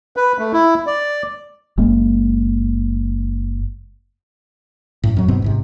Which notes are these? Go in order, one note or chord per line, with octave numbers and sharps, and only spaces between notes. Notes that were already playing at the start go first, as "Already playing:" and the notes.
B4
A3
E4
D5
F#1 G#3 A#3
F#2 A2
F2 F#3
G2 B2 B3 C4
A1 G#2 C3